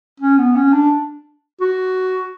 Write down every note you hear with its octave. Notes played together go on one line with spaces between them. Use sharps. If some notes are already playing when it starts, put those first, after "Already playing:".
C#4
B3
C#4
D4
F#4